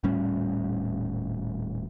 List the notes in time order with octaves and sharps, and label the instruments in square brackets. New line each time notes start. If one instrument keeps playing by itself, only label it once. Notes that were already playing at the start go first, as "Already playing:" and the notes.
[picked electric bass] D#1 A2 G3 C#4